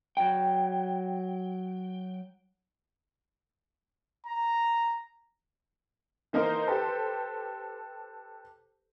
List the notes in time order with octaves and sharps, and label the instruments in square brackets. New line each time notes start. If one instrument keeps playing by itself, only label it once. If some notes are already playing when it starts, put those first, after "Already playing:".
[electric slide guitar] F#3 G5
[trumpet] A#5
[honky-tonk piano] E3 A#3 D#4 A#4 C5
G4 A4 B4 C5